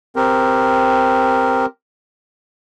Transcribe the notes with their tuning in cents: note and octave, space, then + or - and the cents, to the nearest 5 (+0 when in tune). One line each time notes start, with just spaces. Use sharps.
C4 +0 G4 +0 A#4 +0